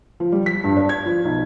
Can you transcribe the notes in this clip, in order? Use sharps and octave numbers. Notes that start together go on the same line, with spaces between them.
F3
G3
B6
G2
D4
G#6
F3
B1